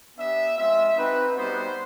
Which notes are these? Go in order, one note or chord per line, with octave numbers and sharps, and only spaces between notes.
B3 D4 G4 E5
G#3 C4 F4 E5
C4 D#4 F#4 B4
G3 B3 D#4 F#4 C5